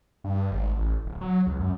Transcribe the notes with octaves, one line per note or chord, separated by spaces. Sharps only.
G2
G#1
A1
D1
F#3
C#2
F#2